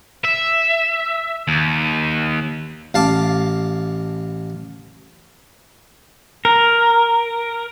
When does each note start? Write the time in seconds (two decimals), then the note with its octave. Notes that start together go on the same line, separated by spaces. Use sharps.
0.24 E5
1.48 D#2
2.94 A1 F5 A5 D6
6.45 A#4